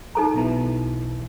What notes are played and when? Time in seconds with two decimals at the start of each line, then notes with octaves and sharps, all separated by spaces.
0.15 D#4 A4 A#5
0.34 B1 B2 E3